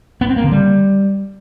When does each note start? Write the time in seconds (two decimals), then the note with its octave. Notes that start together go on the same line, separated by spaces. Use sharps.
0.21 B3
0.29 C4
0.36 A#3
0.44 D3
0.52 G3